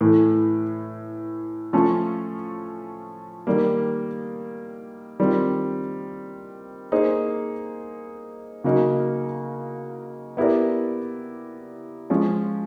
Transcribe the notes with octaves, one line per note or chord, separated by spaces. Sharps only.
A2 E3 A3
F3 A3 C#4 F4 A4
D#3 G3 A#3
D#3 G3 C4 F4
A#3 D#4 G#4 C5
C#3 F#3 A#3 D#4
B3 E4 G4 A#4 D5
F3 G#3 C#4